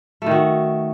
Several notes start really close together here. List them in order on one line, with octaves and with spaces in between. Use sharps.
A3 D#3 F#4